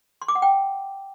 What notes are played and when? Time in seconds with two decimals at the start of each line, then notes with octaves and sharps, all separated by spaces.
0.22 C6
0.28 D6
0.35 F#5
0.42 G5